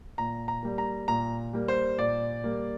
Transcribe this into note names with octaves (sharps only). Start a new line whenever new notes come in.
A#2 A#5
A#5
G3 A#3
A#5
A#2 A#5
G3 A#3
C5
A#2 D5
G3 A#3